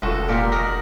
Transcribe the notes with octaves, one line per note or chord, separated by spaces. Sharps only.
F1 C#2 F#4 A4 D#6
A#2 G4 A#4 F6
D#4 F#4 A#4